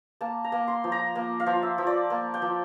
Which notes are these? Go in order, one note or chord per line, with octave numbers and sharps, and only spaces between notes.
A#3 A5
A#5
A#3
C6
F3
A#5
A#3
F5
F3
E5
F3
D5
A#3
G5
F3